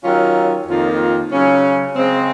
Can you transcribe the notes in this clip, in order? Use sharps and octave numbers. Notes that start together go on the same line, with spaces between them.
D#3 F#3 C#4 F4
F2 D#3 A#3 F4
C#3 F#3 C#4
C#3 G#3 C4